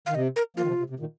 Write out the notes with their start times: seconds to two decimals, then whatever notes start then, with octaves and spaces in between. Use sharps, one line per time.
0.06 D#3 F5
0.15 C3 D#5
0.36 A#4
0.56 F3 A#3 F4
0.62 D#3
0.67 C3 F3
0.79 C3
0.90 C3
1.00 A#2 D#3